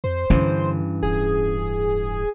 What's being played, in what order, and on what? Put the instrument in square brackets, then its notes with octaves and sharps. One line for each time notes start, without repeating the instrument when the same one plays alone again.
[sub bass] F2 [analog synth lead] C5
[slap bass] G2 E3 [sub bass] D3 [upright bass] C#4
[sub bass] D1 [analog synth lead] G#4